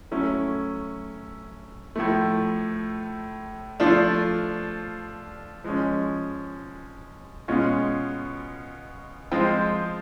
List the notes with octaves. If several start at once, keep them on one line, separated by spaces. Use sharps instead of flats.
F#3 A3 C#4 E4
A2 F3 A3
F3 A3 D4 F4
F3 G#3 C#4
B2 G#3 C#4 F4
F3 G#3 C4 F4